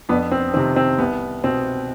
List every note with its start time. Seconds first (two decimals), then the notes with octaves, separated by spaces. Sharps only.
0.09 F2 B3 D4
0.31 C4
0.54 C3 D#3 C4
0.76 C4
0.99 C2 B3
1.44 B2 C4